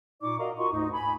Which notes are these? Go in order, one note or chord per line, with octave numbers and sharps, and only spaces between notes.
A#2 D#4 D5 C#6 D6
F#4 A#4 D5 D#5 F5 A#5
F4 F#4 A#4 D#5 C6 C#6
D2 G#2 D#4
G#5 B5